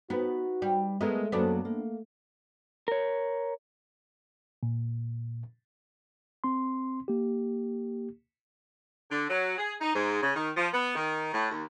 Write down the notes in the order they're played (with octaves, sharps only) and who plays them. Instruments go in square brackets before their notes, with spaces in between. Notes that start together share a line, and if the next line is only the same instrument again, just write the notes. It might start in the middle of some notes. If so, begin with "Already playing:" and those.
[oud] B3 [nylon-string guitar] D#4 B4 [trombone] F#4
[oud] G3
[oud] G#3 A3 [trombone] B3 [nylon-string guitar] A4 A#4 E5
[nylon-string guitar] F#2 F#3 A#3 [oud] B3 D4 [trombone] A4
[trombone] A3 [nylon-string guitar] A#3
[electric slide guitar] A#4 C#5
[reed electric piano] A#2
[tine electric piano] C4 C6
A#3 G4
[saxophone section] D3
F#3
G#4
D#4
G#2
C#3
D#3
F3
B3
D#3
A2
D#2